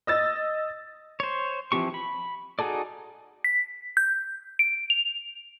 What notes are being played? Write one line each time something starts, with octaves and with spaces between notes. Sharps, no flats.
D#5 E6 A6
C5 C#5
E3 F3 C4 G4 C#6
B5
D#4 F#4 G#4 A4 D5
B6
G6
D7
F7